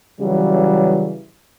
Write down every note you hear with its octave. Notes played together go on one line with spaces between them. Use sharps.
C#3 E3 F#3 G3